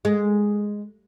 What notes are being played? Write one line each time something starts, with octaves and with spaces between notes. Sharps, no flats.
G#3